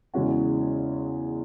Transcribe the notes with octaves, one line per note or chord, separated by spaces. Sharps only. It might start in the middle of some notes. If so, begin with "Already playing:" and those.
E2 C#3 G#3 C#4 F#4